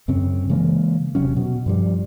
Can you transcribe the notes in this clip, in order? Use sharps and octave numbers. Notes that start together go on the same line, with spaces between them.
F#2 C#3 C4 C#4
C#3 E3 G#3 A#3
E1 C3 F#3 C#4
B2
G2 F3 G3